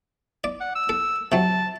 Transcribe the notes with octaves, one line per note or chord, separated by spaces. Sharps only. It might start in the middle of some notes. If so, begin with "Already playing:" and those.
D5
F#5
E6
A4
C3 F#3 A5